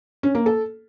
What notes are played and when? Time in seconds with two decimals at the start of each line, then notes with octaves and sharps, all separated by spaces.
0.23 C#4
0.35 A#3
0.46 A4